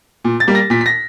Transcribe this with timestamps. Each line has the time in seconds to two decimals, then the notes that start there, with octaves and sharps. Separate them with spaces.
0.25 A#2
0.40 A6
0.47 G3 A#3
0.55 A#6
0.70 A#2 B6
0.81 B6
0.86 A#6